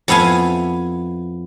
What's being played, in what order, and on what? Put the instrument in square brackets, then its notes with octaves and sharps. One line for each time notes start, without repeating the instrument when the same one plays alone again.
[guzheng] F2 B3 E4 F5 G#5